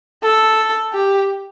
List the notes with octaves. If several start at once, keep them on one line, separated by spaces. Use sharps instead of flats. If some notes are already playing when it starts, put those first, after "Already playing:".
A4
G4